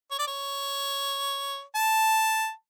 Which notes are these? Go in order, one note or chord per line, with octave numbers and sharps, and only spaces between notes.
C#5
D5
C#5
A5